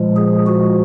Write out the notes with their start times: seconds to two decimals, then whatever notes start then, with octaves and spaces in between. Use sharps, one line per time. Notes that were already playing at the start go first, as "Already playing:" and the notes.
Already playing: A#2 F3 G#3
0.16 G#4
0.46 F#4